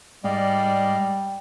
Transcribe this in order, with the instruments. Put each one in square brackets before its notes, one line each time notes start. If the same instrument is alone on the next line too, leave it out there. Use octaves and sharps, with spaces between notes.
[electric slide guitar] G#2 [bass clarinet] G3 [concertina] D5 D#5 F5 [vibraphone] G5